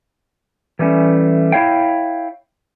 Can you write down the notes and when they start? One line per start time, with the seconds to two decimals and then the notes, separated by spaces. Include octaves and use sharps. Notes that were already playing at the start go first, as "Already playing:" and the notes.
0.79 E3 G3 A3 C#4
1.52 E4 C#5 F5 G5